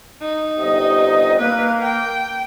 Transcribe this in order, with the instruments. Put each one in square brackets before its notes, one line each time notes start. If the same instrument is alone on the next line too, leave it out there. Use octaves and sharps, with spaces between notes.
[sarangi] D#4
[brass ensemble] G1 C3 D#5
[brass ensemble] A#3 [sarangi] B4
[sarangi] G5